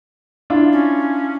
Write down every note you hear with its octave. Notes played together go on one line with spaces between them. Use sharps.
D4 E4 F4
C#4